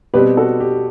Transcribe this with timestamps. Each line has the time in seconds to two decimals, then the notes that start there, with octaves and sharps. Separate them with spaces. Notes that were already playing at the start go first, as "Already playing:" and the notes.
0.14 B2 G3 C4 G4 B4
0.37 F#4 A4
0.60 G4